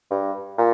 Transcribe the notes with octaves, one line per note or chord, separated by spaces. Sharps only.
G2
A#2